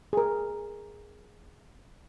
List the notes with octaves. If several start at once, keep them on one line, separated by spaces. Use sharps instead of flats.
G#4 A#4